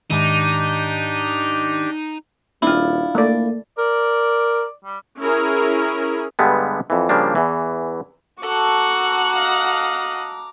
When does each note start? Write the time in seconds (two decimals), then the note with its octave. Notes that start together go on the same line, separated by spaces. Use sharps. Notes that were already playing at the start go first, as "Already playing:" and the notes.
0.11 G#2 D#3 D4 D#4 G4
2.62 D#1 D4 E4 F4
3.15 A3 A#3 D5
3.78 A#4 D5
4.85 G3
5.20 C#4 E4 G#4 A#4
6.39 G2 D3 G3 G#3 B3
6.90 F2 E3
7.09 C#3 F3 G3 A#3 D4
7.35 E2 E3
8.43 F#4 A4 F#5 A#5 C#6 D6
9.37 D#5 F5